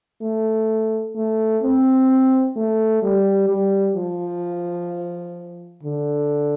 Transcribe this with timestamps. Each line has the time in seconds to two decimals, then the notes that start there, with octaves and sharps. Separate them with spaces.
0.22 A3
1.16 A3
1.63 C4
2.56 A3
3.03 G3
3.49 G3
3.96 F3
5.83 D3